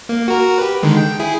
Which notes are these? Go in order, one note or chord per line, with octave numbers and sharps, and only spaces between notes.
A#3
F#4 A#4
G4 B4
D3 D#3 G#3
G5
E4 G#4